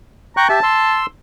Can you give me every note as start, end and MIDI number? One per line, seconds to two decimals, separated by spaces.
0.37 0.48 79
0.37 0.48 82
0.37 0.48 85
0.37 0.48 90
0.49 0.60 67
0.49 0.60 76
0.49 1.01 81
0.63 1.06 84
0.63 1.06 88